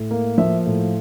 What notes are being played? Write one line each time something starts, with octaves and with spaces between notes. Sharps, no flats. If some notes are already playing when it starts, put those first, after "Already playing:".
Already playing: A2
A#3
F3 E5
A2